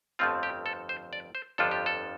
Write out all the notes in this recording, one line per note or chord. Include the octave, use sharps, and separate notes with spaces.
G1 F2 F3 A3 C4 F4
G4
A4
C5
D5
C5
G1 F2 F3 D4 F4 A4
G4
A4